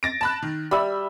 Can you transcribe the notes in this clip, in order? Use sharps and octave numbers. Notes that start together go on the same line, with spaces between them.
A6 A#6 D7
A5 B5 F#6
D#3
G3 E5 B5 E6